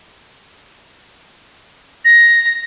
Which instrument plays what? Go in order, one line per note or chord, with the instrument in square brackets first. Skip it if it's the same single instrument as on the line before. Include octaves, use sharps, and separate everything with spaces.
[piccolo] A#6